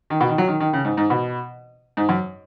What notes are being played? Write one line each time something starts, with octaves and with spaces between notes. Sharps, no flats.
D#3
B2
D#3
F#3
D#3
D#3
C#3
G#2
G#2
B2
G#2
F#2